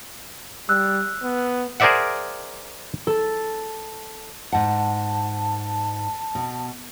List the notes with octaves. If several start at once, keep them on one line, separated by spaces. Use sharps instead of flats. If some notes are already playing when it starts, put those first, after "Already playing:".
G3 E6 F#6
B3
G#4 A#4 C5 D5 E5 F#5
A4
G#2 F#5 A5
B2